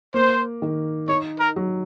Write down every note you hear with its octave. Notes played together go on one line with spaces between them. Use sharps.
A#3 C5
D#3
D#4 C#5
A#4
F#3